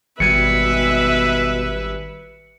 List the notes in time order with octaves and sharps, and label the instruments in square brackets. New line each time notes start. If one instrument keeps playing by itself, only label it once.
[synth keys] G#1 G3 G#5 [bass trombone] B2 [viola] B4 E5 [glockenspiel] C#7